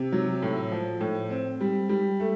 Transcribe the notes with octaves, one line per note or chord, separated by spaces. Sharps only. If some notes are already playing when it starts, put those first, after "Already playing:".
Already playing: C3
F#3
A2
F3
A2
C4
G3
G3
A3